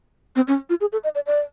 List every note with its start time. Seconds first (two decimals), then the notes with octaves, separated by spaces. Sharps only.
0.36 C4
0.48 C#4
0.70 F4
0.81 G#4
0.92 A4
1.04 D#5
1.15 D5
1.26 D5